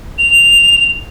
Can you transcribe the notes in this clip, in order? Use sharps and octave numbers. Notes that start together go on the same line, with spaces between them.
F7